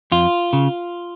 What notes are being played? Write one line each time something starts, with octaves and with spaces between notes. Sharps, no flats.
F2 F4
C#3